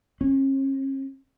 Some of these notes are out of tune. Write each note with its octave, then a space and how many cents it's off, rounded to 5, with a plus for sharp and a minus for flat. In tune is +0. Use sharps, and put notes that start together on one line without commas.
C#4 -45